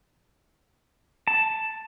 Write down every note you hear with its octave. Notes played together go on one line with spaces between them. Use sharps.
A5